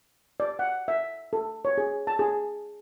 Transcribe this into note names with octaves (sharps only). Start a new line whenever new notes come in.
D5
F#5
E5
A4
C#5
G#4
A5
G#4